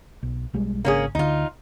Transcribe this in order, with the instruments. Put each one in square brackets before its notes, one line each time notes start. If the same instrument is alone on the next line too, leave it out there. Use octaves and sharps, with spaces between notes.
[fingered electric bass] B1
B1 G3 G#3
[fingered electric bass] G#1 C#3 D4 [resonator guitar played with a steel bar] A#3 C#4 G#4
[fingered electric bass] D2 D3 [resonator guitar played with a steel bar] D#4 F4